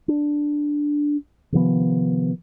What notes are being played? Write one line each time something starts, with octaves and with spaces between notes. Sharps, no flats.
D4
C3 D#3 F3 B3